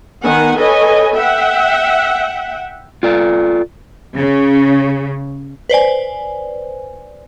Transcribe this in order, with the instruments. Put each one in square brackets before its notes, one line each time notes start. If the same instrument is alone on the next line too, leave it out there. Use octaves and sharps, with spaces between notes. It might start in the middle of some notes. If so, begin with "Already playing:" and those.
[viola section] D#3 B3 F#5 G#5
A4 B4 C#5 D#5 G#5
E5 F#5 G5
[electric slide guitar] F4 A4 D5
[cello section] C#3
[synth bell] B4 C5 D5 G#5